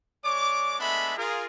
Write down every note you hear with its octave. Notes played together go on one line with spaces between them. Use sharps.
G#3 C#5 D5 D6
G#3 A3 B3 D4 E5 B5
F4 G#4 A#4